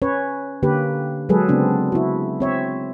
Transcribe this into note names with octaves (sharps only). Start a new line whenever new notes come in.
C#4 B4 C#5
D3 A#3 G4 B4
F#3 G#3 G#4 A4 B4
C#3 B3 C4 D4
E4 F#4
C4 C#5 E5